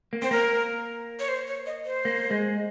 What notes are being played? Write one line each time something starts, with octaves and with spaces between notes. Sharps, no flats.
A#3
C4 C5
A#3 A#4
C#5
C5
C#5
D#5
C5
A#3
G#3